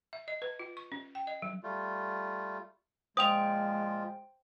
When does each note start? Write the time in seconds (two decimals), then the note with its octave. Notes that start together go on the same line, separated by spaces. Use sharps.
0.13 E5
0.28 D#5
0.42 B4
0.59 F4
0.77 C#6
0.92 C#4
1.15 G5
1.27 D#5
1.42 F#3
1.63 G3 A3 F4
3.17 A#2 F3 G#3 F4 C5 G5 D#6 F7